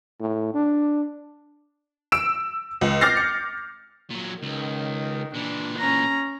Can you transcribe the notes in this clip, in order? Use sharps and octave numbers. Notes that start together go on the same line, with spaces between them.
A2
D4
E6 D7 E7
C#2
D6 F6 G6 A6 A#6 C7
C#7
A#2 F#3
C#2 D#3
A#2 E3 D4
C#4 A#5